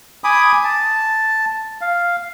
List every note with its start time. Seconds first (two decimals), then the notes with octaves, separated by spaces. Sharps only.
0.24 G#5 B5 D6 D#6
0.64 A5
1.81 F5